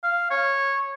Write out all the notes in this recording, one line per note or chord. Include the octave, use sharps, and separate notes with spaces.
F5
C#5